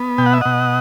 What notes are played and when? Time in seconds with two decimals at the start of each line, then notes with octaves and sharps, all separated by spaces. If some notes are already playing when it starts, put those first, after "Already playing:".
Already playing: B3
0.18 B2 G5
0.26 F#5
0.33 E5
0.41 B2 D#5 F#5